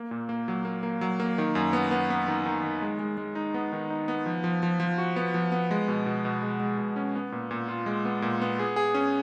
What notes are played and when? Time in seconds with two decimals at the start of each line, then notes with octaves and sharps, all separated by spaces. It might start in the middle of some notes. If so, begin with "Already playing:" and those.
Already playing: A#3
0.11 A#2
0.29 A#3
0.48 F#3
0.65 A#3
0.83 A#3
1.01 F#3
1.20 A#3
1.38 D#3
1.55 F#2
1.73 B3
1.91 B3
2.10 B3
2.28 D#3
2.46 D#3
2.63 D#3
2.82 G#3
2.99 G#3
3.18 G#3
3.35 D#4
3.54 B3
3.72 D#3
3.90 D#4
4.08 B3
4.26 F3
4.44 F3
4.63 F3
4.80 F3
4.98 F#4
5.16 B3
5.34 F3
5.52 B3
5.71 G#3
5.88 B2
6.06 B2
6.25 B2
6.43 G#3
6.60 G#3
6.78 B2
6.96 C#4
7.15 B3
7.32 A#2
7.51 A#2
7.68 F4
7.86 G#3
8.05 B3
8.22 A#2
8.41 B3
8.59 G#4
8.76 G#4
8.94 C#4